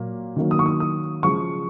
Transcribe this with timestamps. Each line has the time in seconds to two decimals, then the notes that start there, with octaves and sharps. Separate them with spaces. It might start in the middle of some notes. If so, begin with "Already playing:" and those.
Already playing: A#2 F#3 A#3
0.36 D#3 F#3 A#3
0.51 D#6
0.59 C#6
0.66 D#6
0.80 D#6
1.23 C#3 F3 G#3 C#6